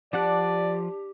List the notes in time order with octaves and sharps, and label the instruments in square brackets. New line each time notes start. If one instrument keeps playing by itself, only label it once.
[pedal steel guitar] F3 F#5 F#6 [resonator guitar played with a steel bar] D4 [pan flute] G4 [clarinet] D5